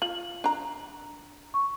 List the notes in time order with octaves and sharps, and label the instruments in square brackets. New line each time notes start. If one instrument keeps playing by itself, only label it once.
[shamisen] F4 [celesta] F#7
[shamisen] D4 A#5
[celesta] C#6